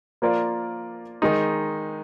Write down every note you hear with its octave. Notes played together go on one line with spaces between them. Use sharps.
F3 A#3 F4 A#4 D5
D#3 G#3 D#4